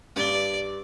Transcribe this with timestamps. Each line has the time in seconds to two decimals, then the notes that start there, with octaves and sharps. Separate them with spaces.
0.16 G2 D5 G7